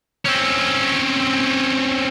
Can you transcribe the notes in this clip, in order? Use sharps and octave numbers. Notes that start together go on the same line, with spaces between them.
C4 C#4